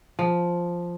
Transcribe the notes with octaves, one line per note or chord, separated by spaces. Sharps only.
F3